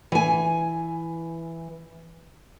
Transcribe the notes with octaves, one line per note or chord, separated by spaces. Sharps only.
E3 G#5